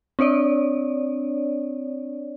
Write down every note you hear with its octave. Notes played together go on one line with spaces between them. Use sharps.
C4 D4 C#5 D5